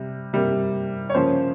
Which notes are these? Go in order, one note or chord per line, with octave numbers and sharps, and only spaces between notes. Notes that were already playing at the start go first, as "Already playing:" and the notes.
Already playing: C3 G3
C3 G3 A#3
C#5
C#3 F3 A#3 C5